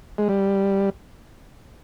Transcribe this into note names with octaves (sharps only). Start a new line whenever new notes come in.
G#3
G3